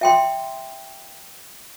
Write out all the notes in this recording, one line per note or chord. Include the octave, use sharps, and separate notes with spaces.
E5 G5 C6